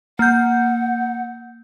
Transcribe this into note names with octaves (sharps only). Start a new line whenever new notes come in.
A#3 F#5 G6